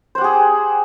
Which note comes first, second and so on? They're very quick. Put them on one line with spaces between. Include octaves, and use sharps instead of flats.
C5 F#5 G4 G#4